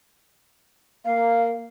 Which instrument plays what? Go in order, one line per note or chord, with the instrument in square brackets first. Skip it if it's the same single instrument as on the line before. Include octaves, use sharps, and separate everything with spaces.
[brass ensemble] A#3 [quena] F5